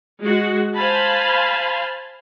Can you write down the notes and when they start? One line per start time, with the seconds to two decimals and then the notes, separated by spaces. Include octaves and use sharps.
0.24 G#3 F#4
0.77 C5 F5 G#5 A5 B5